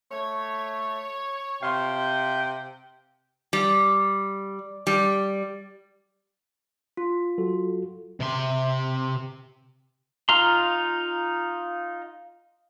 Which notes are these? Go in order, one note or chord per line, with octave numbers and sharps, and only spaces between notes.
A3 C#5
C3 F5 G5 C6
G3
G3
F4
F#3 F#4 A4
C3 C6
D#4 F4 F5 A#5 C6